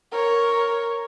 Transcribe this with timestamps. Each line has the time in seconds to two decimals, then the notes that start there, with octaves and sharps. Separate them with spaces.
0.12 A#4 C#5